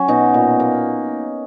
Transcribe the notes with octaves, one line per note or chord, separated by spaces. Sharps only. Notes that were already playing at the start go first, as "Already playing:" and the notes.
Already playing: F#3 C#4
B2 D#4 F#4
A#2
A#3